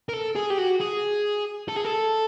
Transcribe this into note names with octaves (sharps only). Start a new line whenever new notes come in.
A#4
A4
G#4
G4
F#4
G#4
A4
G#4
A4